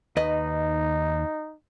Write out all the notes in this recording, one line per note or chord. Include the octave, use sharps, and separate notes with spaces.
D#2 D#4 B4 D#5